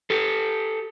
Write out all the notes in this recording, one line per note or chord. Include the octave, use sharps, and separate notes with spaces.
G4 A4